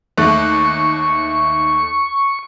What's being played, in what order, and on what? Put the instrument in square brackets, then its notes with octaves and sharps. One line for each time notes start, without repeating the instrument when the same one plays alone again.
[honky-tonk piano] D#2 A3 F#6 [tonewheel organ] C#6